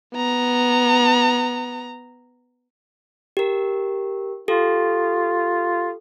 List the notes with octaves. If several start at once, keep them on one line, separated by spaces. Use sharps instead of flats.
B3 A#5
G4 A#4
F4 G4 A4